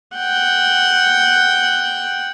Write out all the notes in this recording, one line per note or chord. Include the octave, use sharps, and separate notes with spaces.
F#5 G5